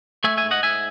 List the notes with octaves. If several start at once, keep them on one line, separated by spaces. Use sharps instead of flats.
A3 E5 G#5
E5 G#5
G#2
D#5 F#5
G#2 E5 G#5